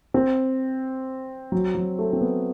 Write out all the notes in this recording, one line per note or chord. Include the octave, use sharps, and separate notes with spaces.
C4
F#3
F#3
A3
C4
B3